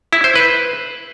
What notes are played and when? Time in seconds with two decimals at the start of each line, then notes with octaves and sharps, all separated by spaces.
0.13 E4
0.24 C5
0.36 B4